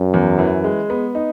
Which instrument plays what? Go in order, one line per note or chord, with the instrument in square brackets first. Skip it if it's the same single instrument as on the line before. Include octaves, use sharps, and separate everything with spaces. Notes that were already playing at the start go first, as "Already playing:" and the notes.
Already playing: [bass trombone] F#2
[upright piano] E2
E3
G#3
B3
D#4